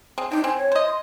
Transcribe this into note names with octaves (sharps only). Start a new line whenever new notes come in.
C4 G#4
D4 D#4 G5
C4 G#5
C#5
C5 D#5
C6